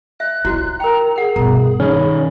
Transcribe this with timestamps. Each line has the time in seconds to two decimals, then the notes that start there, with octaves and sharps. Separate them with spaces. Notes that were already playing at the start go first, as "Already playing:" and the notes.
0.20 E5 F#6
0.45 D#4 E4 F#4 C#5
0.80 A#4 G5 A#5
1.16 G#4 A#4 F#5
1.36 G2 B2 A#5
1.80 D#3 C#4